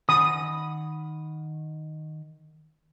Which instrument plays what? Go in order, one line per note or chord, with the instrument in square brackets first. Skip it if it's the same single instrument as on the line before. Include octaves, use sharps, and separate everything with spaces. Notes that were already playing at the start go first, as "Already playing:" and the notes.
[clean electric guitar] D#3 F#5 B5 [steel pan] D#6